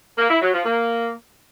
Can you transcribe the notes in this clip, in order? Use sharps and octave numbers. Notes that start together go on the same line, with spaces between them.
A#3
E4
F#3
F3
A#3